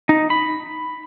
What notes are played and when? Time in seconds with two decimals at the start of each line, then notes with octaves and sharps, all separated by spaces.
0.09 D#4
0.30 B5